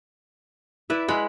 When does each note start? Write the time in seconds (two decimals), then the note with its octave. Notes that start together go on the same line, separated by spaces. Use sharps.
0.90 E4 B4 D5 E5
1.08 G#3 F#5 B5